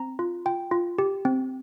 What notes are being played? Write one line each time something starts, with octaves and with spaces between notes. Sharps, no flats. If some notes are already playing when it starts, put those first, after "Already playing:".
Already playing: C4 A#5
F4
F4 G5
F4
G4
C4